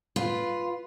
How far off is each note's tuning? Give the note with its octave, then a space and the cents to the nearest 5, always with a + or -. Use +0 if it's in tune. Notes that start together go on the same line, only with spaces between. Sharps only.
F4 -5 B4 +0